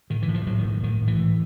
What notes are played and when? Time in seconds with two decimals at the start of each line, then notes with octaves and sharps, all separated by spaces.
0.10 A2 D#3
0.22 E3
0.28 A2
0.34 F3
0.46 A2 F#3
0.58 D#3
0.65 A2
0.83 A2 D#3
1.02 A2
1.07 E3
1.20 A2